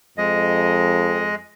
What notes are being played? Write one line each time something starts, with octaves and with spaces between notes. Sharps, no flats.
F2 G#3 D#5